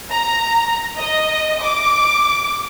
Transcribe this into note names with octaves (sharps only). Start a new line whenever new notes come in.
A#5
D#5
D6